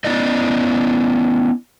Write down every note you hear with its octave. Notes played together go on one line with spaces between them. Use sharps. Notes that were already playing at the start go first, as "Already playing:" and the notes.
B3 C#4 E4 D5 D#5